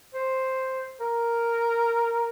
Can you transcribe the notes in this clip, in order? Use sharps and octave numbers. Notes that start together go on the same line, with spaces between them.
C5
A#4